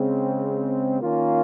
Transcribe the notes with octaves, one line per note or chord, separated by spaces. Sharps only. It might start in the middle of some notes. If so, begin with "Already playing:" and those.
Already playing: C#3 G#3 C4
D#3 A#3 C#4 F4